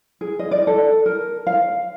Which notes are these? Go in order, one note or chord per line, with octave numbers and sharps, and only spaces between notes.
G#4
D#5
D5
A4
A#4
F5